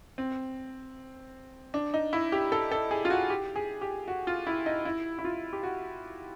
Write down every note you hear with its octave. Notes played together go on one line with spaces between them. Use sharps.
C4
D4
D#4
E4
G4
A4
A4
G#4
F4
F#4
G4
G#4
G4
F#4
F4
E4
D#4
E4
E4
F4
G4
F#4